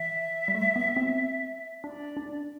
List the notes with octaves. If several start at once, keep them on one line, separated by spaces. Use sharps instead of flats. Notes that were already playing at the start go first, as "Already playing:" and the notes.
Already playing: E3 E5
G3
A3
B3
C4
D4 D5
D4